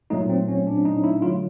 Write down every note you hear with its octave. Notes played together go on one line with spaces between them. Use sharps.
A#2 F#3 A3 D#4
C4
C#4
D4
D#4
E4
D3 F#3 A3 F4